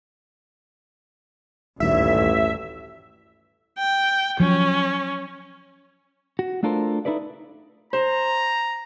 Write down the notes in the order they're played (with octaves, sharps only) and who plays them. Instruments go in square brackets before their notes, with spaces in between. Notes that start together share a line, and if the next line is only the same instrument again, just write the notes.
[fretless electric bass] D#1 D#3 A3 [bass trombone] A1 [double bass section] D2 G2 [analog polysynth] E5
[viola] G5
[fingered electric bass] F3 F#3 [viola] C#4
[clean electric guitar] F#4
A3 D4 F4 A4 A#4 C5
D#4 E4 A4 B4 D5
[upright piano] C5 [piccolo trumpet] A#5